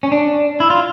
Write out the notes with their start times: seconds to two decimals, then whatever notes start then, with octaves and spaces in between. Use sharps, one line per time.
0.03 C#4
0.12 D4
0.60 E4
0.70 F4